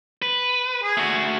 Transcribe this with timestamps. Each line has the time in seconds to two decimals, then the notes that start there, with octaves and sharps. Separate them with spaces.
0.22 B4
0.83 G#4
0.97 A3 F#4